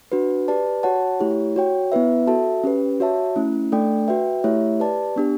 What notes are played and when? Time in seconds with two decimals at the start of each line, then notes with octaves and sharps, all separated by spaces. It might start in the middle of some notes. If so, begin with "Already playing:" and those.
0.12 D4 F#4 B4
0.48 G4 B4 D5 A5
0.83 F#4 C#5 F#5 A5
1.20 A3 E4 G4 C#5
1.56 F#4 C#5 G5
1.92 B3 E4 B4 E5
2.27 F#4 A4 E5 A5
2.64 C#4 G4 B4
3.00 F#4 C#5 E5 A5
3.36 A3 C#4 E4
3.72 A3 D4 A4 D5 G5
4.08 F#4 B4 E5 G5
4.44 A3 E4 G4 C#5 E5
4.80 G4 B4 D5 A5
5.16 B3 D4 G4